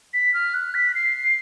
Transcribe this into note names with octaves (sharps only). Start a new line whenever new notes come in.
B6
F6
F#6
B6
C7